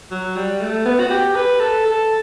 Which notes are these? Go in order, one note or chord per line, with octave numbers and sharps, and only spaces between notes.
F#3
G3
A3
B3
F#4
G4
B4
A4
A4